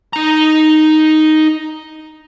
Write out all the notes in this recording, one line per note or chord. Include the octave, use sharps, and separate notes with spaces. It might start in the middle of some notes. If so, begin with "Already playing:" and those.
D#4 A#5